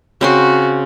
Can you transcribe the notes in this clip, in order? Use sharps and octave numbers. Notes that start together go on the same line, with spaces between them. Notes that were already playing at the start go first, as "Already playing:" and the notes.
C#3 C4 F#4 C6